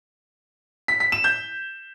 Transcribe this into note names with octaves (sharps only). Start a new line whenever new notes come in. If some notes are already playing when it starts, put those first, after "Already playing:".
B6
B6
E7
G6